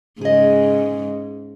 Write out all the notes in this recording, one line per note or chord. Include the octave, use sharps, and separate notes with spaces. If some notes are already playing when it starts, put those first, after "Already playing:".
G#2 C#3 G#4 D#5